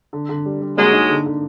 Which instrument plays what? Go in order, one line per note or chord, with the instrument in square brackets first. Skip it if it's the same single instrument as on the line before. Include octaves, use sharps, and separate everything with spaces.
[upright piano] D3
D3
G3
G3
[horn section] F#3 G#3 [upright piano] A#3
[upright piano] D#4
D3
D3